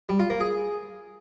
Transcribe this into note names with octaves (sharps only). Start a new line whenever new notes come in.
G3
F4
A#3
G#4